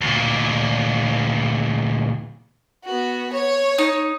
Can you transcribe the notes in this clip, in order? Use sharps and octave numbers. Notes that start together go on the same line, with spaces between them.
D2 A#2
B3 F#4
C#5
D#4